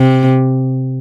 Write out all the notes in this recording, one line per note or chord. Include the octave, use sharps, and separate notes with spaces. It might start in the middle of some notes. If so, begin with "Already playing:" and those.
Already playing: C3